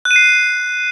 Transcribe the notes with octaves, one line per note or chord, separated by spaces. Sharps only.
F#6
D#7
C7